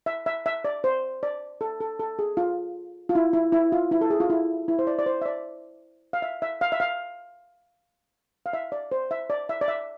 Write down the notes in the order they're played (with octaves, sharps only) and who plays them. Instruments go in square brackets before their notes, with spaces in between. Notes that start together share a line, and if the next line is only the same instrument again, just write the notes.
[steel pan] E5
E5
E5
D5
C5
D5
A4
A4
A4
G#4
F4
F4
E4
E4
E4
F4
E4
A4
G#4
F4
E4
E4
C5
D5
D5
C5
E5
D5
F5
E5
E5
F5
E5
F5
F5
E5
D5
C5
E5
D5
E5
D5
E5